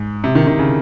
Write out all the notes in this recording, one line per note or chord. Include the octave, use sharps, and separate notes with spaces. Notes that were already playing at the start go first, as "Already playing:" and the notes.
Already playing: G#2
C3
D#3
D#3
C#3